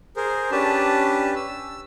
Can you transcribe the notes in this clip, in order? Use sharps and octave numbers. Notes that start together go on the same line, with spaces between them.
G#4 A#4 C5
C#4 D4 G4 B4 A5
E6